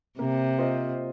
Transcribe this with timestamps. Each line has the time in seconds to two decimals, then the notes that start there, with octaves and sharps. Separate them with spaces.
0.19 C3 A#3
0.59 F4 C5 D#5